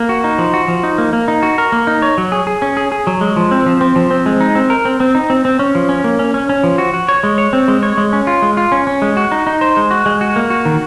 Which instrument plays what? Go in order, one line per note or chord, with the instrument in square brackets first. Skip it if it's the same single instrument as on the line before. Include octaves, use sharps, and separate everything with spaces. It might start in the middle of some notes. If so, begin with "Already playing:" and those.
Already playing: [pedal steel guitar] A#3
F#4
D#4
F3
F#4
F3
D#4
A#3
A#3
D#4
F#4
A#4
A#3
D#4
C#5
F#3
G#4
G#4
C#4
G#4
G#4
F#3
G#3
F3
C4
F3
C4
F3
C4
G#3
D#4
C4
A#4
C4
C4
D#4
C4
C4
C#4
F3
C#4
A#3
C#4
C#4
C#4
F3
F#4
F#4
C#5
G#3
C#5
C4
G#3
C#5
G#3
C#4
F4
G#3
F4
C#4
C#4
G#3
F#4
D#4
D#4
C5
G#3
F#4
G#3
F#4
A#3
F#4
D#3